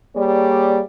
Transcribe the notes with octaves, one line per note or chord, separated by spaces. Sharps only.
G3 A#3 G#4 C#5 D5